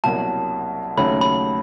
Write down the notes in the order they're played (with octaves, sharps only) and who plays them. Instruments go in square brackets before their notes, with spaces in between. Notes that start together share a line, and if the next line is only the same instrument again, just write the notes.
[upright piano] C2 B2 F#3 A#3 [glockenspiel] A5
[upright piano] D#2 C#3 F#3 A3 C#4 [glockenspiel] B5
[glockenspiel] B5